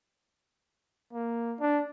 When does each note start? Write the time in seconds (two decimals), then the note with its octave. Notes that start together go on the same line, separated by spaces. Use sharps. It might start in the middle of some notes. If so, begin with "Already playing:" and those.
1.14 A#3
1.60 D4